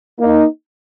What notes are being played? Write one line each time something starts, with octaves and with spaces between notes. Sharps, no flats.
A#3 D#4